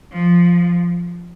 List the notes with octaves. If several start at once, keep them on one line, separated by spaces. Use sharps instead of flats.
F3